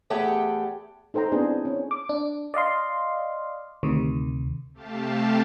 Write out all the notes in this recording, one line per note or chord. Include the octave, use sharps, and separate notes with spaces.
E2 A3 G4 G#4 F#5 G5
D#4 A4 C5 G5 A#5
B3 C4 D4 E4 G#4
C#4
D6
D4
D5 D#5 F5 C6
D2 C3 D#3
C3 A3 G4 F5 A5